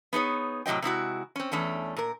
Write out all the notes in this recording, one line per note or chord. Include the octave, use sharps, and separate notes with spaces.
B3 D#4 G#4 C#5
A2 C3 F#3 D#5 G5
C3 G#3 E4 F#4
C4 C#4
E2 A3 C#4 D4
A#2 A#4